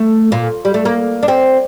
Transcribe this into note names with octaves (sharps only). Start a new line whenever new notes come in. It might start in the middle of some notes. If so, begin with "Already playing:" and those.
Already playing: A3
A#2
G3
A3
A#3
D4
C4